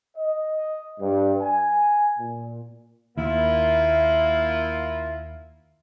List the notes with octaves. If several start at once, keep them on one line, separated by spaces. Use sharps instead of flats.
D#5
G2
G#5
A#2
D#2 A#3 E4 F4